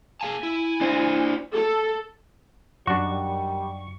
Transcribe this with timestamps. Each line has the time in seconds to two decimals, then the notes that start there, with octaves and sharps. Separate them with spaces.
0.21 G#4 F5 G#5 A5
0.43 E4
0.81 D4 C5
1.53 A4
2.87 F#2 D#3 G3 D4 F#4 C#6